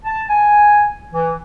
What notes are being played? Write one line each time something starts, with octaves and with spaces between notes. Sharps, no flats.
A5
G#5
E3